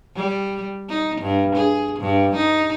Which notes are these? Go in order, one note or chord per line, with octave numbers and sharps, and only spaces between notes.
G3
D#4
G2
G#4
G2
D#4